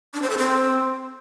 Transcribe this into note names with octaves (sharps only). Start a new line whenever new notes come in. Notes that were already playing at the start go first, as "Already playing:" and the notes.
D4
C5
A4
C4